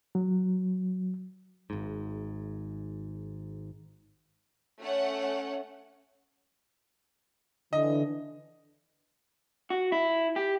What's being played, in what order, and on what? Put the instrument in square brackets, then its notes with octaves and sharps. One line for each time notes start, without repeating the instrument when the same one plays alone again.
[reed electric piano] F#3
[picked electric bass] G#1 G#2
[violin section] A3 C#4 C#5 F#5
[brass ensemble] D3 E3 [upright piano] D#5
[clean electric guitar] F#4
E4
G4